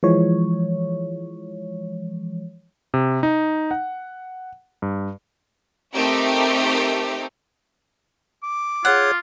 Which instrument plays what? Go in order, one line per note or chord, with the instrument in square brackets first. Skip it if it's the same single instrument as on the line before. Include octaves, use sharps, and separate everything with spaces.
[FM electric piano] E3 F3 G#3 C#5
[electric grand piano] C3
D#4
F#5
G2
[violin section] A3 C4 D#4 G4 A#4
[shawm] D6
[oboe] F4 [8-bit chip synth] G#4 C#5 G#6 [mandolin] F#5